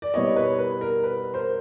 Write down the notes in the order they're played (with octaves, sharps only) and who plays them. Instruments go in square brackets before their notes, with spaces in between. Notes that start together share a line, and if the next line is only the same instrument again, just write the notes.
[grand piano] D5
B2 G3 B3 E4 C#5 D#5
B4 C#5
B4
A#4
B4
A#4 C5